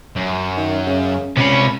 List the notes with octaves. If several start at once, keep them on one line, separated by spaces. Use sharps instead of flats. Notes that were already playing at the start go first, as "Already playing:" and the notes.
F#2
D#3
C#3
C#2 C3 C#4 B5